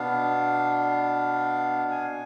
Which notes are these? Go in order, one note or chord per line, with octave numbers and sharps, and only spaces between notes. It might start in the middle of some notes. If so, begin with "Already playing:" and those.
Already playing: B2 B3 D4 F5
G#5